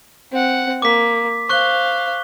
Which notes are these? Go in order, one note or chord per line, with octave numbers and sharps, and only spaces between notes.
C4 F#5
A#3 D6 B6
C5 F5 C#6 F#6 G7